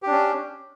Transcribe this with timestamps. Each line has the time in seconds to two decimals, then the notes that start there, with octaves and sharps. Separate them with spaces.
0.02 G4
0.07 D4
0.11 C#4